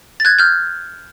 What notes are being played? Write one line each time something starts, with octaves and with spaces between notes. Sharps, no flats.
A6
F#6 G#6
F6 G6